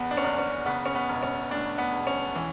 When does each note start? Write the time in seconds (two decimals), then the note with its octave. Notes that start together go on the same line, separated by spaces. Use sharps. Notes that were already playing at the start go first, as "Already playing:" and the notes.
Already playing: F#1 E2 B3
0.11 D4
0.17 C#4
0.24 F#1 D4
0.38 C#4
0.66 C#3 B3
0.85 C#4
0.95 B3
1.09 E1
1.23 C#4
1.50 D2 D4
1.78 B3
1.92 E1
2.07 C#4
2.35 E3